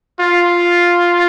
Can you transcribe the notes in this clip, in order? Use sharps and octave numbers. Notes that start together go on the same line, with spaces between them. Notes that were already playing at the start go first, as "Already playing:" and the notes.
F4